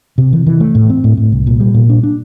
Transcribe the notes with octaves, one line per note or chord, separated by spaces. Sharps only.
C3
E3
E3
A3
A2
C4
A2
A2
C2
A#2
G3
A#2
D4
D4